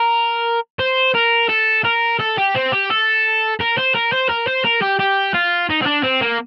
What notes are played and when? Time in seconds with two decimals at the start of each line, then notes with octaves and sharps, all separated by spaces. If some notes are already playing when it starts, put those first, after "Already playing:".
Already playing: A#4
0.79 C5
1.15 A#4
1.49 A4
1.84 A#4
2.19 A4
2.38 G4
2.55 C4
2.72 G4
2.90 A4
3.60 A#4
3.77 C5
3.95 A#4
4.12 C5
4.29 A#4
4.47 C5
4.65 A#4
4.82 G4
4.99 G4
5.34 F4
5.70 D#4
5.82 C4
5.86 D4
6.03 C4
6.21 A#3